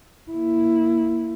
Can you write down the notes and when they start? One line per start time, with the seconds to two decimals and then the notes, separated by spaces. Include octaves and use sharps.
0.31 A#3 E4